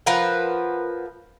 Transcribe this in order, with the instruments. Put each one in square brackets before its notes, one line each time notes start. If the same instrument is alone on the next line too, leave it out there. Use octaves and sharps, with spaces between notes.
[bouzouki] F3 A#4 B4 F#5